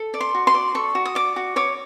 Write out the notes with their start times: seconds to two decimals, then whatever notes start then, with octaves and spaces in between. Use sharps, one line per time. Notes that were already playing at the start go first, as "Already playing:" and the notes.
Already playing: A4
0.14 D5
0.21 C6
0.35 F#4
0.47 C6
0.54 D5
0.75 A4 C#6
0.95 F#4
1.05 D#6
1.15 D5 D6
1.36 F#4
1.56 C#5 D6